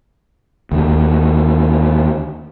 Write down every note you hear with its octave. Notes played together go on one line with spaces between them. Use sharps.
D#2 D3